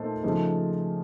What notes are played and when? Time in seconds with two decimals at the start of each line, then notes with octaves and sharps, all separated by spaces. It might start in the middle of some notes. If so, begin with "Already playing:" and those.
Already playing: A#2 A3 D#4 A4 C5
0.23 C#3 F3 A3 D#4